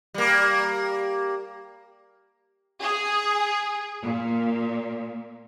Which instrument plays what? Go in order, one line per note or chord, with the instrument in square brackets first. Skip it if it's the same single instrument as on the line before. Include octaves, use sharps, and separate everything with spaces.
[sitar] G3 A#3
[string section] G#4
A#2